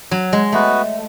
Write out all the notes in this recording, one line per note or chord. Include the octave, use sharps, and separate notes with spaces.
F#3
G#3
A3 B3 F#4 B4